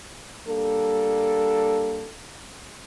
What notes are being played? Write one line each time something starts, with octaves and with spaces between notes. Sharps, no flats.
G3 A#3 D4 A4